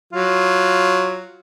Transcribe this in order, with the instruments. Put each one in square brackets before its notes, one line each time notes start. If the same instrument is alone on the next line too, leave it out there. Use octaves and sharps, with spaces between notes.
[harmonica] F#3 F4